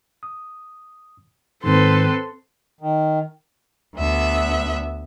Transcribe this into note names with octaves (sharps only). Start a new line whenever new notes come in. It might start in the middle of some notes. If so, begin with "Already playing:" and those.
D#6
G#2 D#3 C4 A4 B4 C6
D#3
D2 B3 E5